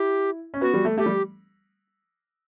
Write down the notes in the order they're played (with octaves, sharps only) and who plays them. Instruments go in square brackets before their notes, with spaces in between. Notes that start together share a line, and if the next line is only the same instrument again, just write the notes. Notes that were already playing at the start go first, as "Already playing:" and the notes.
Already playing: [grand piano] E4 [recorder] G4
[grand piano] C#4
[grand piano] B3 [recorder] F#4
[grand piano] G3
A3
[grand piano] A3 [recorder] G4
[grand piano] G3